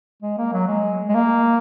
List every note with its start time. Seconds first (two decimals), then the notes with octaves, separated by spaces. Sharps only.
0.22 G#3
0.38 A#3
0.53 F#3
0.68 G#3
1.09 G#3
1.15 A#3